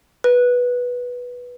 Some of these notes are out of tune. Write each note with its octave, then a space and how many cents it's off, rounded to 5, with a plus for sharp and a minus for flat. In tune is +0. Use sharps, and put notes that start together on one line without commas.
B4 -10